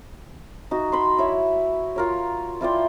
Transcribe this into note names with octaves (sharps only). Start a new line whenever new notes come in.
D#4 F#4
B5 C6
E4 C#5
F4 A#4 C#5
E4 F4 D5 G5